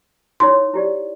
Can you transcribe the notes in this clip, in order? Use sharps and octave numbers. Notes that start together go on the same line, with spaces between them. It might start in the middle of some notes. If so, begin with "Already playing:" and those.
D#4 E4 C#5 C6
E4 G4 D5